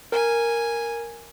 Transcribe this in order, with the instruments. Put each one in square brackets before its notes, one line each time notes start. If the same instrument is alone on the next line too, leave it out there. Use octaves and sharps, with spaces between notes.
[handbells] A#4 [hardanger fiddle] G#5